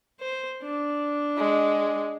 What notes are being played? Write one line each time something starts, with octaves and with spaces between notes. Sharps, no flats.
C5
D4
G#3